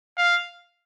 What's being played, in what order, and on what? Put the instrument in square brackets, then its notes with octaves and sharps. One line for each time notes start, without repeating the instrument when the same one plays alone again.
[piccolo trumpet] F5